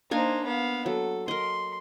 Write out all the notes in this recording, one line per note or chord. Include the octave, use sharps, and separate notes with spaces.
A#3 D4 D#4 C5 G#5
B3 F5
F#3 A4
A#4 D#5 C6